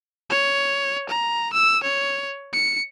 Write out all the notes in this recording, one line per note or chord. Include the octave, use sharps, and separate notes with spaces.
C#5
A#5
E6
C#5
C#7